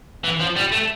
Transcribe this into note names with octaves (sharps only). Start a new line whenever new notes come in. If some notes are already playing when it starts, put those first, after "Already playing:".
E3
F3
G3
A3